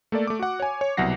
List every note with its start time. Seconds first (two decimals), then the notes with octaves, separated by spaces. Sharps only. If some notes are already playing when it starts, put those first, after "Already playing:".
0.12 A3 A#3 A4 D5
0.27 A3 D6
0.39 F#4 F#5
0.60 C#5 G#5
0.81 C#5
0.97 C2 B2 F#3 F#5 A#6 C7